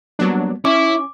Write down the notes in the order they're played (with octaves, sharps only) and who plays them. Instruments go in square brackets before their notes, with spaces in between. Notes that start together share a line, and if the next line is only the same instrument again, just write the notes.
[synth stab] F#3 D4 [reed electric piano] G3 A#3 B3
[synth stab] C#4 [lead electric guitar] E4 [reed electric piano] C#6 [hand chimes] D6